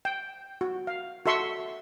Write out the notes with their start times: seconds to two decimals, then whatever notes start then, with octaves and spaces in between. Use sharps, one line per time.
0.05 G5
0.61 F#4
0.87 F5
1.26 F#4 A4 E5 C6 C#6